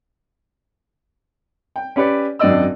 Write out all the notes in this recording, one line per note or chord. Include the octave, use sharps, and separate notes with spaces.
G5
C#4 G4 B4 C#5 D5
G#1 F#2 D4 D5 D#5 E6